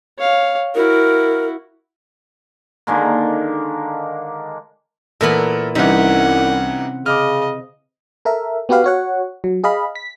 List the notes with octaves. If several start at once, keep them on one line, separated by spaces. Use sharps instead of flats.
C#5 F5
E4 F#4 A#4
D3 D#3 G#3 A#3
A#2 E3 B3 A4 A#4
C2 C3 E3 G3 C#4 D#4 F#5
C#3 D#5 D6 F6
A4 A#4 E5
B3 F#4 G4 B4 F5
F#4 C#5 F#5
F#3
G#4 D#5 F5 B5
B6